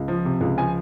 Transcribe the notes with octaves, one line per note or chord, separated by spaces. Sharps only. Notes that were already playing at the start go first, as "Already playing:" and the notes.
Already playing: C#2
F3
C3
C#2
F3 G#5